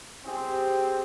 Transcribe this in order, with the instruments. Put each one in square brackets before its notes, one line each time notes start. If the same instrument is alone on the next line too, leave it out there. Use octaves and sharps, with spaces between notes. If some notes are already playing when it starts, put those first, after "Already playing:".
[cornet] C4 [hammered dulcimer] G4 G#4 E5